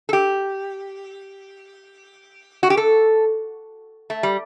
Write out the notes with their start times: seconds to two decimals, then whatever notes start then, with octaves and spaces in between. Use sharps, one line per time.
0.09 A4
0.13 G4
2.63 F#4
2.70 G4
2.77 A4
4.10 A3
4.23 G3